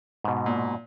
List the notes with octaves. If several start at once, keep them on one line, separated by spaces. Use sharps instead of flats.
G#2 B2
A#2